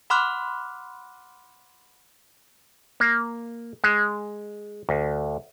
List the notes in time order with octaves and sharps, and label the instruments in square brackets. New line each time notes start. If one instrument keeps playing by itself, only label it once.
[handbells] F#5 B5 C6 D6 F6 F#6
[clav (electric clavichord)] A#3
G#3
D2